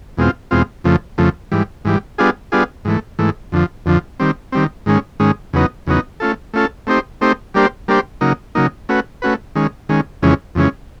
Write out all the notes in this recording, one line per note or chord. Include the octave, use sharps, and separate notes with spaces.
E2 B2 G#3 C4 F4
E2 B2 G#3 C4 F4
F2 C#3 F3 A3
F2 C#3 F3 A3
G#2 E3 G3
G#2 E3 G3
G3 B3 D4 F4 G#4
G3 B3 D4 F4 G#4
G#2 E3 A3
G#2 E3 A3
F2 D3 F3
F2 D3 F3
D#3 G3 C4
D#3 G3 C4
G#2 D#3 G#3 C#4
G#2 D#3 G#3 C#4
E2 C#3 F#3 B3 D#4
E2 C#3 F#3 B3 D#4
A3 C#4 F4 A4
A3 C#4 F4 A4
A3 C4 D#4 G4 C5
A3 C4 D#4 G4 C5
G3 A#3 D4 G4 C5
G3 A#3 D4 G4 C5
C#3 F#3 A#3 D#4
C#3 F#3 A#3 D#4
A3 C#4 F#4 B4
A3 C#4 F#4 B4
D#3 G#3 C#4
D#3 G#3 C#4
F2 C#3 E3 G#3 C#4
F2 C#3 E3 G#3 C#4